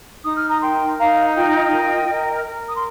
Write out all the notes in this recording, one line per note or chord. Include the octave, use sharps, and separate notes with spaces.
D#4 D#6
F6
A#5 D#6
A#4 G5 C6
D#4 F5 A#5
F4 D#5 G5
A#4
A#4
A#4
D#6
C6